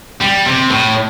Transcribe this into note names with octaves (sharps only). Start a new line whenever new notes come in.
G3
C3
A2